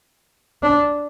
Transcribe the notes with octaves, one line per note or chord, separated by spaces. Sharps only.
D4